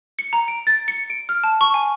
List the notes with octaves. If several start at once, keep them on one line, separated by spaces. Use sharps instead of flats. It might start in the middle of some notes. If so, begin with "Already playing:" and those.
C#7
A#5
D7
A6
C#7
D7
F6
A5
C#6
G#5